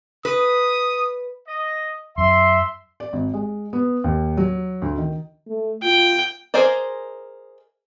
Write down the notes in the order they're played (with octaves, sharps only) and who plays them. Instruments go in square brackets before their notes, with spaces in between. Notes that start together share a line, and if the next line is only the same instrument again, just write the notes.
[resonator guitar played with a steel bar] B4 [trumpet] D#6
[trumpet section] D#5
[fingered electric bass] F#2 [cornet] E5 [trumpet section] C6
[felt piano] D5
G#1
G#3
B3
D#2
F#3
D2
D#3
[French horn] A3
[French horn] F4 [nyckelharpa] G5
[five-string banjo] G#4 A#4 C5 D5 D#5